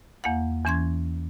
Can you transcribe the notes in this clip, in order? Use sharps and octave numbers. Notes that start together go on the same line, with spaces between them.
E2 A#3 F5 F#5
E2 E3 C#4 C6 G#6